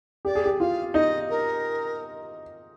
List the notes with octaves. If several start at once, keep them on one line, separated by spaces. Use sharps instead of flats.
G4 D5
G#4
G4
F4 F5
D#4 D#5
A#4